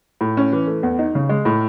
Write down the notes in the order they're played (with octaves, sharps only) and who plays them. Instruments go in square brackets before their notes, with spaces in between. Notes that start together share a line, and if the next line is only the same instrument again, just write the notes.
[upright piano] A2
C#4
E3
A3
E2
D#4
C#3
G#3
A2